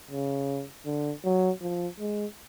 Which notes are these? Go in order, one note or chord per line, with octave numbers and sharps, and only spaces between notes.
C#3
D3
F#3
F3
G#3